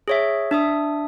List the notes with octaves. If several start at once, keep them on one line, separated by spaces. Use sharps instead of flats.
G#4 C#5 E5
D4 E5 D#6